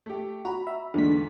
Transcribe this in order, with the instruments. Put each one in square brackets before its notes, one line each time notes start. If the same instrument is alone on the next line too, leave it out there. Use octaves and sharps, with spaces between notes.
[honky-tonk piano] A3 G4
[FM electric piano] F#4 [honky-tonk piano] A#5 B5
[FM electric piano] E5
[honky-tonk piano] E2 G#2 [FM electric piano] D3 B6